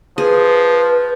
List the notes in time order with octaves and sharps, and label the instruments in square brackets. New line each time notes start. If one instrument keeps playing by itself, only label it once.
[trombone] F3 [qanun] G#4 [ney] B4